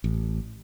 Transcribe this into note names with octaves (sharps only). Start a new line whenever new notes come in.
A1